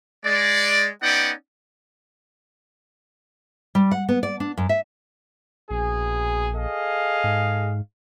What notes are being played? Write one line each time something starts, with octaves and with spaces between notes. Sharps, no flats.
G#3 D5
B3 C#4 D#4 D5 F#5 G5
G3
F#5
B3
D5
D4
F#2
E5
A#1 B2 G#4
G#4 A4 D#5 F5
G#2